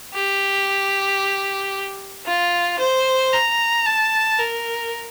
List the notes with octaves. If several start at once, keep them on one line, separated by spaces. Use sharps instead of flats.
G4
F4
C5
A#5
A5
A#4